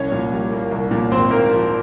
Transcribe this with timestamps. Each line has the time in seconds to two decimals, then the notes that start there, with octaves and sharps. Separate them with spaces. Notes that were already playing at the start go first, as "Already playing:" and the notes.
Already playing: C2 C#4 C#5
0.12 A#2
0.32 G3
0.52 A#3
0.72 C2
0.91 A#2
1.11 G#1 C4 C5
1.30 G#2 A#3 A#4
1.50 F3